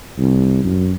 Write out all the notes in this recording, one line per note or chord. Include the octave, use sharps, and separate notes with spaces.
C2
F#2